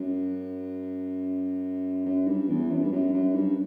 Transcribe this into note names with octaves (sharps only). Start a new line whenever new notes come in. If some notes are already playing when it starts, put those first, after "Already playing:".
Already playing: F#2
F#2
G2
E2
F#2
G2
F#2
F#2
G2